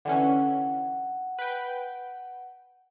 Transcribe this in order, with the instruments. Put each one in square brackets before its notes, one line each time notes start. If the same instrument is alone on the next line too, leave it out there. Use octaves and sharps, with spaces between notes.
[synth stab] D3 E3 C#4 [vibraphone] F#5
[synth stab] B4 G5